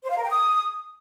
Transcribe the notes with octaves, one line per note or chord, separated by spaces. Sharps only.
C5
F5
A#4
G5
D#6